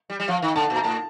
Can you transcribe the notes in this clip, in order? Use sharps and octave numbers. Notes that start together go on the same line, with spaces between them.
G3
G3
F3 F5
D#3
D3 A5
A#2
A#5
A2 A5